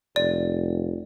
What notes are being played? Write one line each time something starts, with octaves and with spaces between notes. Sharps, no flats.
F1 D5